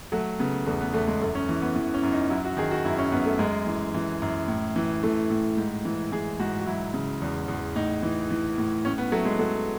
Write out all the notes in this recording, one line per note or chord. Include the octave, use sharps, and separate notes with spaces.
F#3 A3
C#3 B3
E2 A3
B3
E2 A3
G#3
F#2 A3
C#4
E3
B3
E3
C#4
F#2
D#4
F#3 E4
F#4
D#3 G#4
F#4
F#2 E4
C#4
F#2 B3
A3
F#2 G#3
E3
E3
F#2
A2
E3
E3 A3
A2
G#2
E3
E3 G#4
G#2 F#4
F#4
F#3 E4
C#3
E2
E2
A2 D#4
E3
E3
A2
A2 C#4
B3
F#3 A3
G#3
F#3 A3